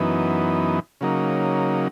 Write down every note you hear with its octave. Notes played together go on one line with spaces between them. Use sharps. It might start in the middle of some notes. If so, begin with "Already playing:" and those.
Already playing: F#2 E3 B3 D#4
C#3 F#3 A#3 D#4